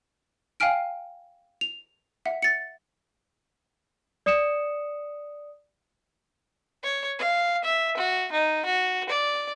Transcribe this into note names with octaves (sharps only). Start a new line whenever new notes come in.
F5 G5 G#5 F6 D7
F7
E5 F#5
A6 C#7
D5 D#6 C#7 E7
C#5
F5
E5
F#4
D#4
F#4
D5